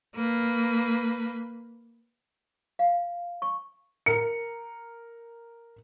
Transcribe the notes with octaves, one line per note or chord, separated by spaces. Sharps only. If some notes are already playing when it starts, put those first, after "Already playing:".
A#3 B4
F5
C#6
A#4 C#7